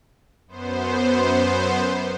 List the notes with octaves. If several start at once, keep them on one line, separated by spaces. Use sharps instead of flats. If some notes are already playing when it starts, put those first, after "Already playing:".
F#2 B3 C5